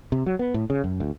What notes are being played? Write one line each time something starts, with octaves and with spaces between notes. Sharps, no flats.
C3
F#3
B3
A2
C#3
F#2
D2